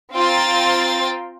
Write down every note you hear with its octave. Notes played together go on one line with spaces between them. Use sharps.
C4 F4 G5 A#5 C6 A6